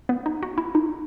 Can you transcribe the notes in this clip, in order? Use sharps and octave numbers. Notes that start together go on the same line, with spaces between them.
B3
D#4
F#4
E4
D#4